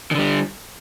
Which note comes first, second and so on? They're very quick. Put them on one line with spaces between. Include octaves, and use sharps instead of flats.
D#3 D3 G3